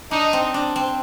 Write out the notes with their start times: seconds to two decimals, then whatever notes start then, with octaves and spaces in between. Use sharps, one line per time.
0.11 D4 D#4
0.33 C4
0.54 D4
0.76 C4